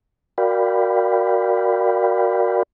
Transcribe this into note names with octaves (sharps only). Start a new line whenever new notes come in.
F#4 A#4 D5 F5 G5 B5